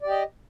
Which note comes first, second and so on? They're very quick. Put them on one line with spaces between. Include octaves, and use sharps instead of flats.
D5 G4 D#5